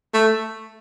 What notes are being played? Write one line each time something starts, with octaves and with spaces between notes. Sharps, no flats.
A3